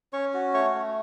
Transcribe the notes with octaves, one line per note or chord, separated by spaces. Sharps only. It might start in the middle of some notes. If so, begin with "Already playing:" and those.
C#4 C#5 C#6
F#4
A3 C#5 C#6
A3